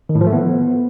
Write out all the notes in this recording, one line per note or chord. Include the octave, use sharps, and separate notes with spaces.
D#3
A2
F3
A3
B3